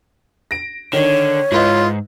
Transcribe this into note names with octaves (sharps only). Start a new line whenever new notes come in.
A#6 D7
D3 D#3 D4 C#5
G#2 E4 F4 B4 D#5